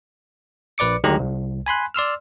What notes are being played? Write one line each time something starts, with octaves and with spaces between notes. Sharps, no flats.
A#1 B4 D5 D6 C#7
D2 D#3 F#3 G#3 G4 A#5
C2
G#5 B5 C6 F#6
D5 C6 E6 F6